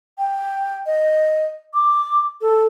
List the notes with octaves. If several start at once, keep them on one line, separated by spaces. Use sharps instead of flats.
G5
D#5
D6
A4